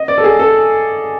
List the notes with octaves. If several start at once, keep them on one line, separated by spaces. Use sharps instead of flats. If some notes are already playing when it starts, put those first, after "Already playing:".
Already playing: D#5
D5
A4
G#4
A4